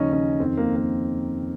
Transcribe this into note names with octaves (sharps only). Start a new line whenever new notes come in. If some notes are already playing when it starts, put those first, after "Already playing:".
Already playing: D#2 C#3 F3 C#4 D#4
C#4
F2 D#3 C4
A#3
A#3